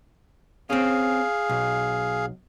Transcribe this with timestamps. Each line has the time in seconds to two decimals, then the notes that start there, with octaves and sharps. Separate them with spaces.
0.70 C4 C#4 G#4 F5
1.49 B1